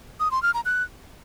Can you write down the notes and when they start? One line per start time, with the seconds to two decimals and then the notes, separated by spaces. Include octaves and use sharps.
0.20 D#6
0.31 C6
0.43 F6
0.54 A#5
0.65 F#6